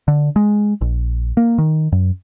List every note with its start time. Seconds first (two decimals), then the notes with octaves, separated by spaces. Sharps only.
0.08 D3
0.36 G#3
0.81 A#1
1.37 A#3
1.58 D#3
1.92 F#2